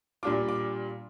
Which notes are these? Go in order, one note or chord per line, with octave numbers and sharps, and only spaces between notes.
A#2 G3 D4 F4 D6
D6